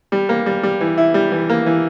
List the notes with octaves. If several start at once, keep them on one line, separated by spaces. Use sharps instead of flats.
G3
A#3
G3
G3
E3
E4
G3
E3
A#3
E3